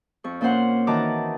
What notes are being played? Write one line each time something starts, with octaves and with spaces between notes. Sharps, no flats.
F2 C#6
A#2 A#3 C#4 C5 F#5 C6
D#3 E3 F#4 A5 A#5 D6